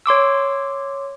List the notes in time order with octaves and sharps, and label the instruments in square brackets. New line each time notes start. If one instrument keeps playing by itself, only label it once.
[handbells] C#5 C6 D6 E6